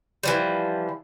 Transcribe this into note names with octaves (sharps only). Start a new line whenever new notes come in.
E3 F3 G3